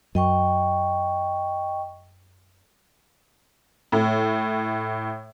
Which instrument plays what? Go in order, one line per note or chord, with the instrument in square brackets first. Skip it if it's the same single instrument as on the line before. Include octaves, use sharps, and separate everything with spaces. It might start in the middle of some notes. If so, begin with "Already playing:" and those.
[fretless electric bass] F#2 [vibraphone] D#5 G5 C#6
[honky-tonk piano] A2